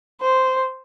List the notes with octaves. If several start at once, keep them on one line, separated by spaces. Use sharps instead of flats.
C5